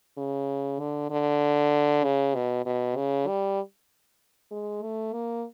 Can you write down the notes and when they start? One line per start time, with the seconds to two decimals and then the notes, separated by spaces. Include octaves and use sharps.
0.18 C#3
0.79 D3
1.10 D3
2.04 C#3
2.35 B2
2.66 B2
2.96 C#3
3.28 G3
4.51 G#3
4.83 A3
5.13 A#3